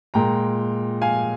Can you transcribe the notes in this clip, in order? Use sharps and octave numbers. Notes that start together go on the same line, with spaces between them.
A#2 G#3 G5 A#5
F5 G#5